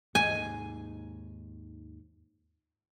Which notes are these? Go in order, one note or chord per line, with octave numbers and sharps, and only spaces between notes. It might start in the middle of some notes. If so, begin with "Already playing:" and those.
D#2 G#2 G#5